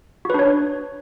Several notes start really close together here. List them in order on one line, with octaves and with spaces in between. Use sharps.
F#4 B4 D4 C#5